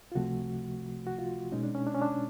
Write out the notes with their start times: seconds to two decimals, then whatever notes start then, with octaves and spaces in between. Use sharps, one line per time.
0.12 F4
0.15 C#2 C3 F3 A3 F#4
1.07 F#4
1.18 F4
1.52 B2 G#3 C#4 D#4
1.63 D4
1.75 C#4
1.87 D4
1.94 C#4
2.02 D4